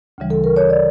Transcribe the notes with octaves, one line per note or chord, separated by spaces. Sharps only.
D2 C#3 E3 G3
A4
A#4
C#5
D5